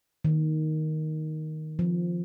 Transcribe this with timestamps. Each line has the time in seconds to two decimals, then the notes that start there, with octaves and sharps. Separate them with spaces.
0.24 D#3
1.79 F3